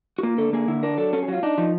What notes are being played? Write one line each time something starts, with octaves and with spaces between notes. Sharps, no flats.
F#4
A#3 F4
D3 A4
A#3 G#4
D3 E4
D4 A#4
F#3 A4
C#4 A4
G#4
F#3 F4 F#4
D4 D#4
F3 D#4